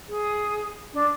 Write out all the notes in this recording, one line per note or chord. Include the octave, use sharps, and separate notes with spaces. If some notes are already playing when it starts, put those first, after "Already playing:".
G#4
D4